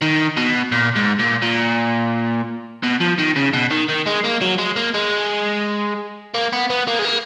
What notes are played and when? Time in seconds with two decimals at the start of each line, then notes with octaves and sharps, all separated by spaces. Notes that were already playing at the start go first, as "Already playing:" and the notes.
0.01 D#3
0.37 B2
0.72 A#2
0.96 G#2
1.19 A#2
1.42 A#2
2.83 B2
3.00 F3
3.18 D#3
3.36 C#3
3.53 B2
3.71 D#3
3.88 D#3
4.06 G#3
4.24 A#3
4.41 F#3
4.58 G#3
4.76 A#3
4.94 G#3
6.34 A#3
6.53 B3
6.70 B3
6.87 A#3
6.99 G#3
7.05 A#3